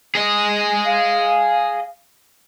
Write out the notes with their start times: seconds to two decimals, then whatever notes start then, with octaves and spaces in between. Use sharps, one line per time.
0.15 G#4 D#5
0.85 F5